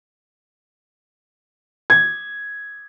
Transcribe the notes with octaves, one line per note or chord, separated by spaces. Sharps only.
G#6